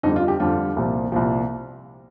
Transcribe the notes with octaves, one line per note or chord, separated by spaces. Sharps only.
F2 D3 G3 D#4
F4
G4
F2 D3 G3 F4
C2 A#2 F3
C2 A#2 F3